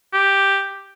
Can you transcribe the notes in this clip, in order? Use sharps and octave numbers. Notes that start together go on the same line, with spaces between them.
G4